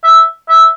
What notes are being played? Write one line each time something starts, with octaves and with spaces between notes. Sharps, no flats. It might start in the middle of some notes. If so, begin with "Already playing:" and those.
E5
E5